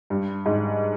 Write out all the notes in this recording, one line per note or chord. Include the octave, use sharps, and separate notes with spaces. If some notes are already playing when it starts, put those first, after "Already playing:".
G2
G#2